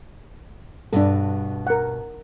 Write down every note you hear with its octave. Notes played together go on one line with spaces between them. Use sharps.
G2 B2 D4 A4
A#4 F#5